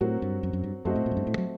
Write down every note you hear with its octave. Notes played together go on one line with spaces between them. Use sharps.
A2 F#3 C4 F#4 A#4
G2
F#2
F#2
G2
F#2 A3 C4 F#4 C5 D#5
A2
A#2
F#2
G2
A2
F#3